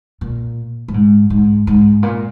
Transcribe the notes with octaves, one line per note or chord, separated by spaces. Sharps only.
A#2
A2
G#2
G#2
G#2
A#2